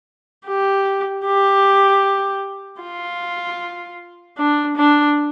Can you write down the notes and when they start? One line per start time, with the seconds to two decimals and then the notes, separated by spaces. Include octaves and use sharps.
0.47 G4
1.25 G4
2.81 F4
4.38 D4
4.77 D4